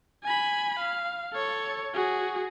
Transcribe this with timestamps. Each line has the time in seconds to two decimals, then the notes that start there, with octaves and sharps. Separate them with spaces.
0.24 G#5 B5
0.80 F5
1.34 A4 C#5
1.94 F#4 G#4